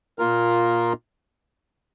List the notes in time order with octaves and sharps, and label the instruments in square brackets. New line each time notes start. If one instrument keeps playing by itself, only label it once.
[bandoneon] A#2 A#3 F4 A#4